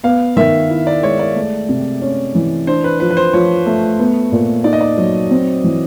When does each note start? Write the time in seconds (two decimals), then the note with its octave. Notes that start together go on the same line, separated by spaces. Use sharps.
0.03 B3 F5
0.36 D#3 E5
0.70 E4
0.87 D5
1.03 G#3 C#5
1.19 D5
1.35 A3
1.69 C3
2.02 C#4
2.35 E3
2.67 D4 C5
2.84 B4
3.00 F3 B4
3.11 B4
3.17 C5
3.33 F3 C#5
3.66 A3
3.99 B3
4.32 A#2
4.64 D#4 D5
4.73 D#5
4.81 D5
4.97 F#3
5.30 C4
5.64 E3